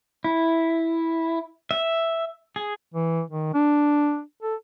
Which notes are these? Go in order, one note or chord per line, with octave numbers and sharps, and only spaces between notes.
E4
E5
G#4
E3
D#3
D4
A4